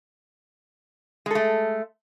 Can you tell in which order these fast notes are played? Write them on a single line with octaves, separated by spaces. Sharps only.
G#3 A4 A3